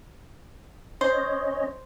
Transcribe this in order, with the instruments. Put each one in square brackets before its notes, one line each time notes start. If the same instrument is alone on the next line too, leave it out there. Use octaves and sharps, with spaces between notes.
[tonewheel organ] C#4 C#5 D#5 [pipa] C5